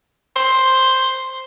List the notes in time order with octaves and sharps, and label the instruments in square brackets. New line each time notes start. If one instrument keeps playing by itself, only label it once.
[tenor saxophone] C5